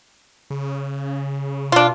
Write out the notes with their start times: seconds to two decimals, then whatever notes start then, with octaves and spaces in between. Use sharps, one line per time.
0.50 C#3
1.72 B2 D4 F4